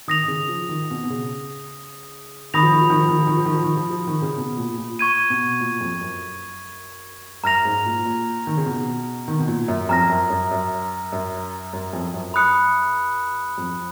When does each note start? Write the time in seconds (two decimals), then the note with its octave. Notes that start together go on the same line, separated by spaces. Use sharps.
0.08 D#3 D#6 A#6 F7
0.24 D#3
0.28 C#3
0.49 F3
0.69 D#3
0.91 B2
1.04 B2
1.10 C#3
2.54 D#3 B5 D#6 A#6 F7
2.63 F3
2.72 D#3
2.81 F3
2.90 D#3
2.99 F3
3.09 D#3
3.19 F3
3.27 D#3
3.37 F3
3.46 D#3
3.54 F3
3.64 D#3
3.77 F3
3.91 F3
4.07 D#3
4.22 C#3
4.38 B2
4.57 A#2
4.78 A#2
4.99 C#6 G#6 D#7
5.30 B2
5.60 A#2
5.81 F2
6.01 F#2
7.43 F#2 A#5 F6 A#6 F7
7.65 G#2
7.85 A#2
8.05 A#2
8.47 D#3
8.57 C#3
8.66 B2
9.28 D#3
9.39 B2
9.48 A#2
9.68 F#2
9.89 F2 A#5 F6 A#6
10.09 F#2
10.30 F#2
10.51 F#2
11.12 F#2
11.73 F#2
11.93 F2
12.14 F#2
12.34 B5 D#6 F#6 C#7
13.58 F2